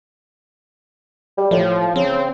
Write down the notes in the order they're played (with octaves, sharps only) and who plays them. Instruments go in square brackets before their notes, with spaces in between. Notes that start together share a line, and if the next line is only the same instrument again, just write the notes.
[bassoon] G3
[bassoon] A2 [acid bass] F3
[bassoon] C#3 [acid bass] C4